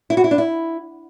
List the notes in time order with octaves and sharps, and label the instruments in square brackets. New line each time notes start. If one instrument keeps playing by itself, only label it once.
[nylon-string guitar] E4
F#4
E4
D4
E4